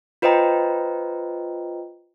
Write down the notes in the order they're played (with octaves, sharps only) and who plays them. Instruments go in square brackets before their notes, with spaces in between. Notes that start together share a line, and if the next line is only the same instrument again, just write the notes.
[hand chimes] F4 B4 C5 D#5 G5 A#5